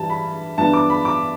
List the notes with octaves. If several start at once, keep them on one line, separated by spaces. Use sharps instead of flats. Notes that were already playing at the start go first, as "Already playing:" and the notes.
Already playing: G2 E3 G3 A5
B5
G2 E3 B3 D4 A5
D6
B5
D6